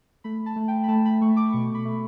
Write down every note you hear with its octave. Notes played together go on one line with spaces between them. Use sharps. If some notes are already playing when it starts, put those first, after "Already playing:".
A3 B5
A5
A3
G5
B5
A3 A5
B5
A3 C#6
D6
B2 C#6
B5
A3